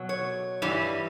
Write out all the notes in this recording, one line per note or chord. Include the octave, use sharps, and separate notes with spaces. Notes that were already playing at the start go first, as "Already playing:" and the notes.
Already playing: B2 F#3
C#5
G2 E3 G3